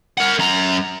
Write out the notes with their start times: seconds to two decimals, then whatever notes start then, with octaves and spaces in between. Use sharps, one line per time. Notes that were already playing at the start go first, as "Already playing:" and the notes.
0.18 A#4 F#5
0.39 F#2 A#5